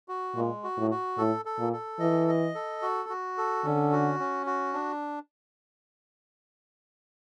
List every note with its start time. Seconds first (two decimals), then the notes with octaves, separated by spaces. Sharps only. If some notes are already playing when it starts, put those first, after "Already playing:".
0.08 F#4
0.36 A#2 G#3
0.64 F#4
0.77 A2
0.91 F#4
1.18 A2 A4
1.45 A4
1.59 A#2
1.73 A4
2.00 E3 D#5
2.28 D#5
2.55 A4
2.82 F#4
3.09 F#4
3.38 A4
3.65 D3 C#4
3.92 F#4
4.20 C#4
4.47 F#4
4.74 D4